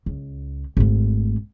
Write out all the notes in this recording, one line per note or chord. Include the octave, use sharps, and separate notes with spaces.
C#2
G#1 A3